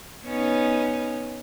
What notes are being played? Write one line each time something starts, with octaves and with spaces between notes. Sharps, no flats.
B3 C#4 D#4